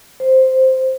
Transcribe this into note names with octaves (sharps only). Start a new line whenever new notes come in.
C5